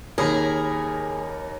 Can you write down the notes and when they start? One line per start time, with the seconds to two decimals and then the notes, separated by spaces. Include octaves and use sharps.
0.18 D#2 G#4 A#4 C#5 B5